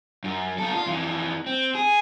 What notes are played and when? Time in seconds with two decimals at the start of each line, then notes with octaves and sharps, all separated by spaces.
0.24 F#2
0.58 B3 A4
0.74 F4
0.87 F2 E3
1.46 C4
1.75 G#4